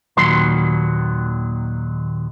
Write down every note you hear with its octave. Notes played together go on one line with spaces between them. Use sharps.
D#2 A#2 D#3 F#3 B4 C6